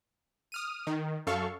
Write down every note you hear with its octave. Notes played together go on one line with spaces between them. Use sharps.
D#6 F6 D#7
D#3
F#2 A4 F5 C#6